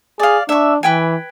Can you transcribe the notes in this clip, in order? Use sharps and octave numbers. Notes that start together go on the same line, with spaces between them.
G#4 D5 F5
D4 E5 C#6
E3 B4 G5 G#5